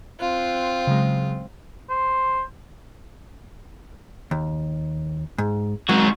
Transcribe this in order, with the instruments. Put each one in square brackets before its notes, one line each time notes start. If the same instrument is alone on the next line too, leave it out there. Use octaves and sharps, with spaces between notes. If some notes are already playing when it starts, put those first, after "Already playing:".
[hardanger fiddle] C4 F4 [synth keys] F#6
[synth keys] C#3 F#3 G#3
[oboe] C5
[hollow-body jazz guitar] D#2
G#2
[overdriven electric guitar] G#2 F#4 [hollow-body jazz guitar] F#3